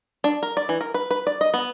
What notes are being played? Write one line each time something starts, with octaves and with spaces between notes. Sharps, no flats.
D4
A#4
D5
E3
A#4
B4
B4
D5
D#5
B3